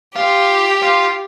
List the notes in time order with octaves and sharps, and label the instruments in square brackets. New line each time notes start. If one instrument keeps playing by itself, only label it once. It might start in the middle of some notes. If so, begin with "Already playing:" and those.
[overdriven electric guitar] F4 [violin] G4
[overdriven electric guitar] F4